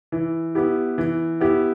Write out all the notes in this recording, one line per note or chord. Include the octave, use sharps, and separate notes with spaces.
E3
B3 E4 G4
E3
B3 E4 G4